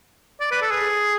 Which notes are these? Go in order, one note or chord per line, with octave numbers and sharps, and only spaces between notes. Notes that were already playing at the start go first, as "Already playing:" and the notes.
D5
B4
A4
G#4